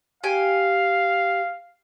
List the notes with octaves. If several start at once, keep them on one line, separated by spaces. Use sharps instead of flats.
G4 F5 G#5